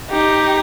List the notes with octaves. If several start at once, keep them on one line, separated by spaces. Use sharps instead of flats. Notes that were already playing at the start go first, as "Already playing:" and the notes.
D#4 G4